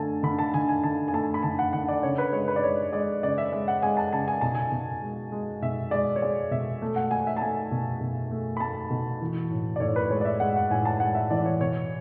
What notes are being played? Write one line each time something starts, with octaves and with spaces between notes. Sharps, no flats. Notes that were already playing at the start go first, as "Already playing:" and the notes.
Already playing: D3 A3 G#5 A5
D3 B5
A5
D3 G#5
G#5
D3 A5
G#5
A3 A5
B5
D3 A5
F#5
D3 F#5
D5
C#3 C#5
B4
G#3 C#5
B4
D5
G#3 C#5
G#3 D5
C#3 D5
E5
G#3 E5
F#5
G#3 G#5
A5
C#3 A5
G#5
B2 A5
G#5
B2
G#3
G#3
B2 E5
G#3 D5
C#5
G#3 D5
B2 E5
A3
F#5
A3 G#5
E5
A5
A3 G#5
B2
B2
A3
B5
A3 A5
B2
E3
A2
D5
A2 C#5
B4
G#3 C#5
D5
E5
G#3 F#5
F#5
A2 G#5
A5
G#3 F#5
E5
E3 D5
C#5
B2 C#5